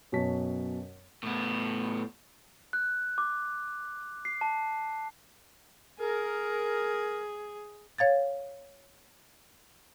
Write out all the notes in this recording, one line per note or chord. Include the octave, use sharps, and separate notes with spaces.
F#2 B2 C#5 A5 B6
A2 B3
F#6
D6
C7
A5
G#4 A#4
C#5 F5 G#6 A6